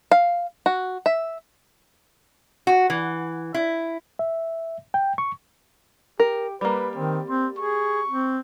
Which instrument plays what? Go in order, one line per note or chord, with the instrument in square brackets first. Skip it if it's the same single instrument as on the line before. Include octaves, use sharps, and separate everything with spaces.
[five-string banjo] F5
F#4
E5
[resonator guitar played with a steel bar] F#4
E3
E4
[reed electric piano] E5
G5
C#6
[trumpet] G4 [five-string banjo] A#4
[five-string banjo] G3 A#3 [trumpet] B4
[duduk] D#3 [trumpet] C4
[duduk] C4 [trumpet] C6
[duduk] G#4 [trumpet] C#6
[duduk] C4